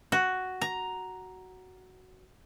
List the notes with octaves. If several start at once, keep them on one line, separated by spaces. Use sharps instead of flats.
F#4
A#5